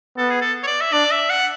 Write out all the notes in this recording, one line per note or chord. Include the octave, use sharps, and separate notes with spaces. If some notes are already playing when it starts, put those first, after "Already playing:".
B3 A4
G#4
A4
C#5
D5
E5
D4 D5
E5
F#5